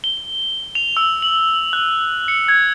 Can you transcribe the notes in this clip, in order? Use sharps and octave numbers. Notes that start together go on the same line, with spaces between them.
G7
F7
E6
F#7
F#6
C#7
G#6